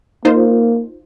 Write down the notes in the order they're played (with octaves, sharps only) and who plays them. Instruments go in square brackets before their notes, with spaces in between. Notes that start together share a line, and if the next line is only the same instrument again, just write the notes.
[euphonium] A#3 [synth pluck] D#4 F4 C5